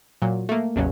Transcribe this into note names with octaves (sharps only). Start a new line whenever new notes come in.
A#2 F#3
A3 A#3
A1 E2 C#3 F#3